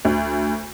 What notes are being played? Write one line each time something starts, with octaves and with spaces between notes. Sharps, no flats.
D2